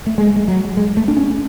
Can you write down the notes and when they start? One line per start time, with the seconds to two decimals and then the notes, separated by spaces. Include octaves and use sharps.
0.06 A3
0.18 G#3
0.36 G#3
0.48 F#3
0.77 G#3
0.97 A3
1.08 D4
1.17 C#4